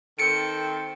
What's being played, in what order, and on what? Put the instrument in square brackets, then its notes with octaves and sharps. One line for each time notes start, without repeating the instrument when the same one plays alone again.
[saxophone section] D#3 C4 A4 [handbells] C#7 D7